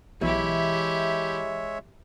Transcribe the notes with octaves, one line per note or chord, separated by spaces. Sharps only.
B1 E3 G#3 E4 G4 C#5 E5